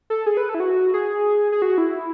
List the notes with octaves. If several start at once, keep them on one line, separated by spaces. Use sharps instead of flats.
A4
G#4
B4
A4
E4
F#4
G#4
G#4
F#4
E4